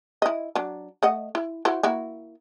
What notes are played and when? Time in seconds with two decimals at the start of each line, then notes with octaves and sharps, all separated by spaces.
0.22 E4 D#5
0.55 F#3 D4
1.03 A3 D#5 F#5
1.35 E4
1.65 E4 F#4 C5
1.83 A#3 E4 F#4